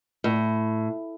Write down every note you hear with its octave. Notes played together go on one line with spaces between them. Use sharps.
A2